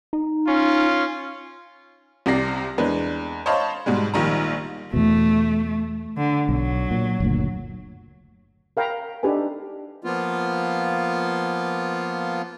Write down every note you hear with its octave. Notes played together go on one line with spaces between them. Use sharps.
D#4
C#4 F4
C2 C3 C4 D5 A#6 C7
E2 G#3 D4 B4
C5 C#5 D#5 F5 A5 B5
G#2 B2 G3 G#3
A#1 D#3 G3 A#5
E2 B2 A3
D3
B1 F#3
A#2
F#1 D2 A#2
A#4 F5 G5 A#5 B5
D4 D#4 G4 A4 B4 G#5
F3 A#3 B3 F4